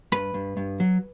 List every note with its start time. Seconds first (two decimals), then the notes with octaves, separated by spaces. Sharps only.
0.12 G2 B4 B5
0.34 G2
0.57 G2
0.80 F#3